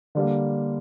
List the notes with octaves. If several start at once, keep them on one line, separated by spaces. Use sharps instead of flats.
D3 G3 A#3